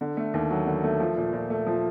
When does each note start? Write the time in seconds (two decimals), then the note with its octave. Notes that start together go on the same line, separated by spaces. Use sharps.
0.01 D3
0.17 A3
0.34 D#2
0.50 F#3
0.67 D3
0.84 A3
1.00 F3
1.17 A#2
1.33 A#2
1.50 A3
1.66 F3